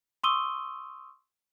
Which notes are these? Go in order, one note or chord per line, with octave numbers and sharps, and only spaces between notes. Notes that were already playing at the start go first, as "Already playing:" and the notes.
C6 C#6 D#6 E6 D#7 G7